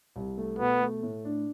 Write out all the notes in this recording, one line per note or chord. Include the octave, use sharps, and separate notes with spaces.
C2
A3
B2 B3
A3
A2
D4